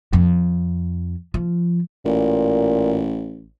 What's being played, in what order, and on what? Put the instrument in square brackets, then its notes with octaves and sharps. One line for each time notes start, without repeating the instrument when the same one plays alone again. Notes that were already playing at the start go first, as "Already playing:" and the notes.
[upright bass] F2
F3
[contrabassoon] A1 [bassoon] A#2